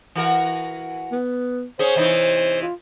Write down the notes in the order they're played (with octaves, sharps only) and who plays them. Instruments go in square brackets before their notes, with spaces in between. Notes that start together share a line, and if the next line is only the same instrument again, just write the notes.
[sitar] E3 F#4 A#4
[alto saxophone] B3
[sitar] C#4 G#4 [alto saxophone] C5
[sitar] C3 E3 D#4
[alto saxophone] F4